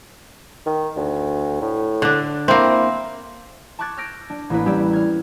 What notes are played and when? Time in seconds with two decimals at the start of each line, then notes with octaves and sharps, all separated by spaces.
0.66 D#3
0.96 D2
1.62 A2
2.02 D3 D4
2.48 A#3 C4 E4
3.79 A5 C#6 D6 F#6 G#6 A6
3.97 E6 F6 G6 A#6 D7
4.30 D4
4.50 A1 A#3 E4 B4
4.66 G3 C#4 G4 D5 E6
4.93 F6 G#6